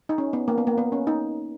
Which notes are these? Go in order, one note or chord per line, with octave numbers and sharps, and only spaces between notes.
D#4
C#4
B3
A#3
B3
A#3
B3
C#4
D#4